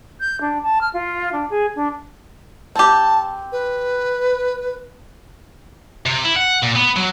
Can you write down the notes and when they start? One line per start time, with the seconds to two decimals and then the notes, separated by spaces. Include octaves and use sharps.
0.20 G6
0.40 D4
0.62 A5
0.80 F6
0.93 F4
1.32 D4
1.49 G#4
1.75 D4
2.76 C4 G4 A5
3.52 B4
6.06 C3
6.25 E4
6.36 F#5
6.63 A#2
6.76 B3
6.97 F#3